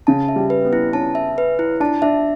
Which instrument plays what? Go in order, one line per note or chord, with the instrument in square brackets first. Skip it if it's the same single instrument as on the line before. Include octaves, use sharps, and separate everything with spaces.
[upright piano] C#3 [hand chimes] A5
[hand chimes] E5
[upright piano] G3
[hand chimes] B4
[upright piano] B3
[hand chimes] E4
[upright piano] C#4 [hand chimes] A5
[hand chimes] E5
B4
E4
[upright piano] D4 [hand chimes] A5
[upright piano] D4 [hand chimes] E5